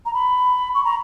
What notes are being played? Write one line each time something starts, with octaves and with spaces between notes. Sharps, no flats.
A#5
B5
C#6
A#5